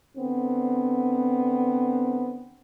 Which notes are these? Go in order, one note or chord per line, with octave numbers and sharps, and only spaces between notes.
D3 B3 C4